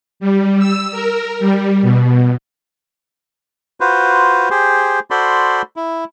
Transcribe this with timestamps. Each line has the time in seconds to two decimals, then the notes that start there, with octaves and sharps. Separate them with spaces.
0.20 G3
0.59 E6
0.92 A#4
1.39 G3
1.82 B2
3.80 F4 F#4 B4 C5
4.50 G4 G#4 C5
5.11 F#4 A4 C5 D5 B5 C6
5.76 E4